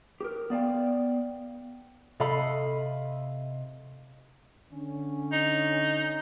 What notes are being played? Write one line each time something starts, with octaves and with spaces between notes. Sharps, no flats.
G4 A#4
B3 D5 F5 G5
C3 A4 D#5 F5 B5
D3 C#4
D#4